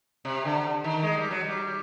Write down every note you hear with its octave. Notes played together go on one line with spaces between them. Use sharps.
C3
D3
D#3
G#3
G3
F#3
G3